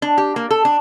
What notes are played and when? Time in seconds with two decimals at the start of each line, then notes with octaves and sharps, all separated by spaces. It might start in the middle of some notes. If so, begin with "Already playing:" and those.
0.02 D4
0.18 G4
0.36 A#3
0.51 A4
0.65 D4